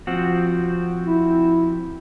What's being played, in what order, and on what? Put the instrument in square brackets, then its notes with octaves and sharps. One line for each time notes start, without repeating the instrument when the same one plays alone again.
[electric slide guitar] F3 C4 F#4
[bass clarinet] E4